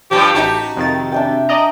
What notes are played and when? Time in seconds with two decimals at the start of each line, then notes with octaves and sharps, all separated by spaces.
0.11 G2 C3 F3 G4
0.35 A1 D#4 F#4 A5 B6
0.77 F2 C3 D#3 A6
1.12 D4 E5 G5
1.49 D5 D#5 A#5